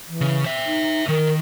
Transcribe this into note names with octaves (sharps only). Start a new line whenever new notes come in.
E3
C#3
C5 E5
D#4
D#3 A#4